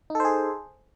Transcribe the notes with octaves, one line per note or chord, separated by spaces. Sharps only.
D#4 G#4 A4 C5